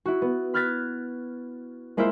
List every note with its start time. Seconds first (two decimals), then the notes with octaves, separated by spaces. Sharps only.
0.06 E4 F#4
0.22 B3
0.54 B5 F6 F#6 G#6 A6 B6
1.97 G#3 A#3 E4 F4 C5 E5